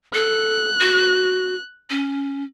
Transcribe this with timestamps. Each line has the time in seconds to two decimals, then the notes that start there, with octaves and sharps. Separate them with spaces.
0.14 A4 F#6
0.80 F#4
1.90 C#4